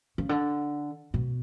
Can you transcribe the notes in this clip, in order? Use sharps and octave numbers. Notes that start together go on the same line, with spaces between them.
C#3
D3
B2